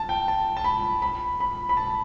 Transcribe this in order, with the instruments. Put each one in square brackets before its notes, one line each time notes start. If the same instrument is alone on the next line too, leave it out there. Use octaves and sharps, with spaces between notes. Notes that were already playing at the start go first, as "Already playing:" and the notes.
Already playing: [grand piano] A5
G5
A5
A5
B5
B5
B5
B5
A5